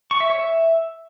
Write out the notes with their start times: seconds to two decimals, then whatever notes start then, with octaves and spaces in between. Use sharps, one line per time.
0.11 C#6
0.20 E5
0.30 C#5
0.39 E5